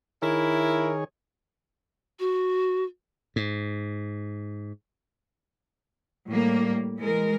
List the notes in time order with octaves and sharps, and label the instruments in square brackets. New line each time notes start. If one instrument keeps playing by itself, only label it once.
[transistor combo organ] D#3 G#4 C#5 [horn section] E4 [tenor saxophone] A#4
[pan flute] F#4
[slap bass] G#2
[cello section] A2 G3 A#3
E3 G#3 A#4